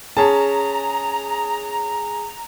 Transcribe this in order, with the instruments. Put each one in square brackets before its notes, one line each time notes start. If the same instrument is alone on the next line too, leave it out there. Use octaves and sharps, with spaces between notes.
[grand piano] C#4 A5 [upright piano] G#4 [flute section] A#5